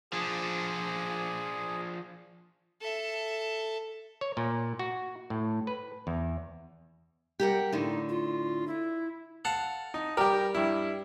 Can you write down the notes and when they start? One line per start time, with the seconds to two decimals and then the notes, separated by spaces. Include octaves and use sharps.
0.13 F3 D4 G#4
2.81 A4 E5
4.21 C#5
4.37 A#2
4.79 F#4
5.30 A2
5.67 B4
6.07 E2
7.40 G3 G4 A#4 F#5
7.72 A2 D3 D#4
8.09 F4
8.68 E4
9.45 A4 F5 F#5
9.94 D#4
10.17 G3 G4 A#4
10.55 G2 E4